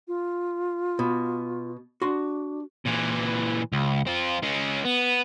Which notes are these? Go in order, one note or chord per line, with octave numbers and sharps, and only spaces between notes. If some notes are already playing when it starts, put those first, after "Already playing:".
F4
B2
D4 F#4 C6
A#2 E3
C#2
C4 F4
G#3 C#4
B3